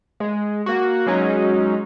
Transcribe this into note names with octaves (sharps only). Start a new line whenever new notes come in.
G#3
A#3 F#4
F#3 G#3 C#4 D#4